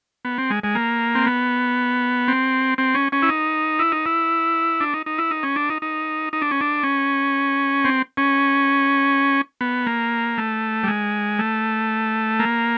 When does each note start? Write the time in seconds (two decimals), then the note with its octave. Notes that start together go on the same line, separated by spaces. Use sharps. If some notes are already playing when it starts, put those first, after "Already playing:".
0.25 B3
0.38 C4
0.50 G#3
0.64 G#3
0.75 A#3
1.15 C4
1.26 B3
2.28 C4
2.78 C4
2.94 C#4
3.12 C#4
3.23 E4
3.29 D#4
3.79 E4
3.92 D#4
4.06 E4
4.80 D4
4.94 D#4
5.06 D#4
5.18 E4
5.31 D#4
5.43 C#4
5.56 D4
5.70 D#4
5.82 D#4
6.33 D#4
6.42 D4
6.51 C#4
6.61 D4
6.83 C#4
7.85 C4
8.17 C#4
9.61 B3
9.87 A#3
10.38 A3
10.83 G3
10.88 G#3
11.39 A3
12.39 A#3